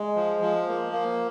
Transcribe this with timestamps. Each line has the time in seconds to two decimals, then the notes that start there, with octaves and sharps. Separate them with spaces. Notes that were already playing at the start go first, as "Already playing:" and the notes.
Already playing: G#3
0.16 F3
0.41 F3
0.68 A#3
0.93 A#3